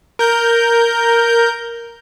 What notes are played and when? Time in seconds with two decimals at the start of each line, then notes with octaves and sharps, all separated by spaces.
0.19 A#4 G6